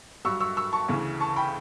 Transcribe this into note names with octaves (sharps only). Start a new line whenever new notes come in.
G2 F#3 C#6 E6
C#6 E6
C#6 E6
A5 C#6
D2 C#3 E3
A5 C#6
G5 B5